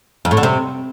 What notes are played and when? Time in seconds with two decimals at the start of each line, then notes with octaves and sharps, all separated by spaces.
0.25 F2
0.31 A2
0.37 D3
0.43 C3